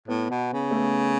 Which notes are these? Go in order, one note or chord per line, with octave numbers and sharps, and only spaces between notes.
A2 B3
B2
C#3
A3
B3